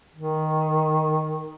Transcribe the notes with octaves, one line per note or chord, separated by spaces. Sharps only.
D#3